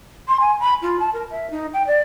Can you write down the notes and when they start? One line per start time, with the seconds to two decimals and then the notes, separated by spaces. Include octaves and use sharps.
0.28 C6
0.40 G#5
0.60 B5
0.82 F4
1.00 A5
1.13 A#4
1.31 E5
1.51 D#4
1.73 G5
1.87 D5